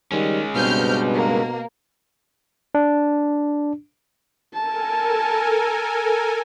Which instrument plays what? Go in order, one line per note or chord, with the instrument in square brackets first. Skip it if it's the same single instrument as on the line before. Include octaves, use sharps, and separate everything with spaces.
[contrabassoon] D#3 [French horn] G3 [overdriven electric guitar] G#3 C#4
[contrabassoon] G2 [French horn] B2 [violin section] C4 F6 G6
[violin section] A#3
[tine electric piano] D4
[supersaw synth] A4 A#4 G#5 [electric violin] A5